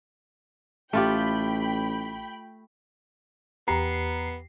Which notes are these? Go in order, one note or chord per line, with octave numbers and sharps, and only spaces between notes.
A1 A3 F4 G4 G5 B5
E2 B3 G4 A#5 C7